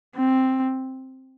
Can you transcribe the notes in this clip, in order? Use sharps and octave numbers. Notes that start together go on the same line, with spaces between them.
C4